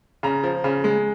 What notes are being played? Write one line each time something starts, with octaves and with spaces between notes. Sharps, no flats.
C#3 A#5
F3
C#3
G#3